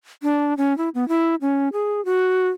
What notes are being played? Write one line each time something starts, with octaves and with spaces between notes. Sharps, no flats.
D4
C#4
E4
B3
E4
C#4
G#4
F#4